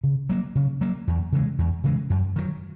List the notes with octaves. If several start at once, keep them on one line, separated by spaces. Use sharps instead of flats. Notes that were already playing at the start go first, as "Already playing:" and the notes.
C#3
F#3 A#3
C#3
F#3 A#3
E2
C#3 E3 G#3
E2
C#3 E3 G#3
F#2
D#3 F#3